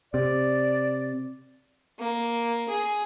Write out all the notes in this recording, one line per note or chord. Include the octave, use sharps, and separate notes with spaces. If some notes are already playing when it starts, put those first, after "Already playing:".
C3 D5
A#3
G#4